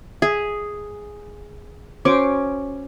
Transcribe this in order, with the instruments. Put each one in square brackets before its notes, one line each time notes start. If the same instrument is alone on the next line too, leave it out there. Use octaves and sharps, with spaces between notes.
[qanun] G#4 [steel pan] E5
[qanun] C#4 [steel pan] F#4 C5 D6